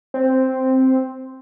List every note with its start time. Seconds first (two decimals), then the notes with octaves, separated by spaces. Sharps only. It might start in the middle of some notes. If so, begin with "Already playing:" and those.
0.14 C4